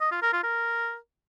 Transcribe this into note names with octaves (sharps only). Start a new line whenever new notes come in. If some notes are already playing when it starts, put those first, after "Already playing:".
D#5
F4
A#4
F4
A#4